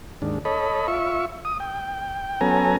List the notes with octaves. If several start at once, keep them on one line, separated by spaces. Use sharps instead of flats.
D#2 G#2 D4
A4 C#5 D#5 B5
F4 E5 C#6
D#6
G5
F#3 B3 C#4 A4 G#5 A#5